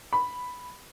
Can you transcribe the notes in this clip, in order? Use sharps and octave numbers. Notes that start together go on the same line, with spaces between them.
B5